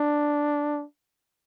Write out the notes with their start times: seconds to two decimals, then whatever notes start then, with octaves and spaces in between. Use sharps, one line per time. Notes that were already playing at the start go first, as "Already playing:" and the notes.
Already playing: D4